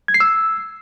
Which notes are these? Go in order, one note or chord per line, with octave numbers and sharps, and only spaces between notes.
G#6
C7
E6